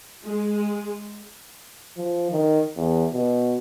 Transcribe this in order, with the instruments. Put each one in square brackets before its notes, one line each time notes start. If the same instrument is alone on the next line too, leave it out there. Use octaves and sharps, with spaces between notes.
[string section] G#3
[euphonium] F3
D#3
E2
B2